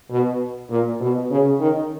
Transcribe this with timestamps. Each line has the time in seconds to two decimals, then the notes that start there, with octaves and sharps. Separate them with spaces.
0.11 B2
0.70 A#2
1.00 B2
1.31 C#3
1.60 D#3